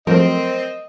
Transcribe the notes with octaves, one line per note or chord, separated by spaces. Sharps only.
F3 F#3 A3 C4 A#4 D#5